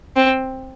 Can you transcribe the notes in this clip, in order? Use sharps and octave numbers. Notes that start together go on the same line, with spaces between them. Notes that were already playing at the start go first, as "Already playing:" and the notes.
C4